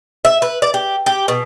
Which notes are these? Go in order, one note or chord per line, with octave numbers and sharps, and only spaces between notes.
E5
B4
D5
G4
G4
B2